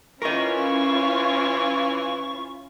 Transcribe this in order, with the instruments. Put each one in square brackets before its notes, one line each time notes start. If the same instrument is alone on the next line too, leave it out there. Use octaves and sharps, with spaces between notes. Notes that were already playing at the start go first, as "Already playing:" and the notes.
[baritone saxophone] E3 [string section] C#4 E4 F4 [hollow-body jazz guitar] A#4 D#5 [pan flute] C#6